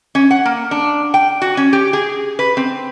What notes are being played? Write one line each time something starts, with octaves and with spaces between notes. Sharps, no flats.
C#4
F#5
A#3
D4
G5
F#4
C#4
G4
G#4
B4
C4